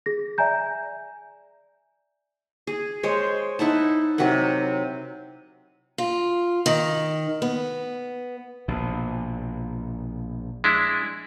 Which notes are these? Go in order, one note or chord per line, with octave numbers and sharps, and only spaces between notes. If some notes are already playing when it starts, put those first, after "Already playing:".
G#4 A#6
D5 E5 G#5 A#5 G6
G#4
G#3 C5 C#5
D#4 E4 F#5 A5
C3 F#3 A#4 F#5
F4
D#3
B3
A#1 B2
G#3 D4 E4